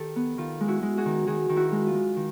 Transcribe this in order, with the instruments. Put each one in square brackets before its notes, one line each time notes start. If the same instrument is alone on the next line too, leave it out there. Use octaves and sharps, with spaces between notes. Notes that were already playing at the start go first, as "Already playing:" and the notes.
Already playing: [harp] D#3 G4 A4
B3
D#3 F4
G#3
E4 F#4
G#3
F#4 G#4
D#3
D#3 F#4 G#4
D#3
E4 F#4
G#3
F4
G#3
D#3